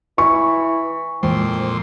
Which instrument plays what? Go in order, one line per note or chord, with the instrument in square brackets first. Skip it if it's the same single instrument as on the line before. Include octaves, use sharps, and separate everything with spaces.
[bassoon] E3 [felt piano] C#6
[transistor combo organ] F2 A#2 C6 [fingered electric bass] E3 G#3 [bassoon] C4